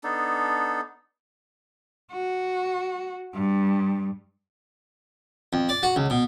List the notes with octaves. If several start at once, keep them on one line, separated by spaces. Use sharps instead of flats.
B3 D4 D#4 A4
F#4
G2
F2
D5
F#4
C#2
B2